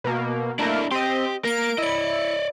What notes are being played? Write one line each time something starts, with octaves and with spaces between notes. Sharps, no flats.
B2 A#3
A3 A#3 D4 E4 A#4
C4 G4 D#5
A#3 A#4 D7
E4 D5 D#5 C#7